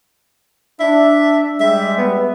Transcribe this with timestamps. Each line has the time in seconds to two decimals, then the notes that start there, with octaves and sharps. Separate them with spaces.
0.80 D4 E5
1.60 G3 G#3 E5
1.98 B3